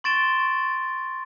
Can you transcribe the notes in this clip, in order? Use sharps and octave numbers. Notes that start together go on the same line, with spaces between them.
C6 C#6 A6 D7 E7 G7